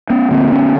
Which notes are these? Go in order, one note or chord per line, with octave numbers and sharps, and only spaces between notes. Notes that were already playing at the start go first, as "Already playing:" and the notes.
B3 C#4
D2 D3 A#3 C4
B3 C#4